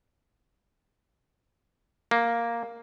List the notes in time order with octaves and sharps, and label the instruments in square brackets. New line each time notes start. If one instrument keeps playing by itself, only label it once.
[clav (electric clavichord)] A#3